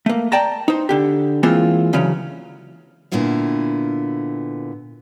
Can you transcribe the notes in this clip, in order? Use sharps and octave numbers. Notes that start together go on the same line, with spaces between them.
A3 A#3
D5 G5 A5 A#5
D#4 C5
D3 G4
E3 G#3 A#3 C4 F4
D2 C#3 E3 F#3 C#4
A#2 D3 B3 E4 F5